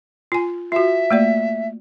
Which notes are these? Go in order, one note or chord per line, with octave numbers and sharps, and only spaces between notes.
F4 G#5
F4 F#4 E5
A3 A#3 D5